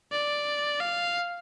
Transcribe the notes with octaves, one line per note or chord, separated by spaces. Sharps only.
D5
F5